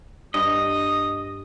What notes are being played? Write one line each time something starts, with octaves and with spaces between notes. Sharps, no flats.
G2 D#5 D#6